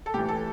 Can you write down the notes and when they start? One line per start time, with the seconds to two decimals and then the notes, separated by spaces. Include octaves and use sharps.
0.06 A4
0.14 A2 E3 G4
0.28 A4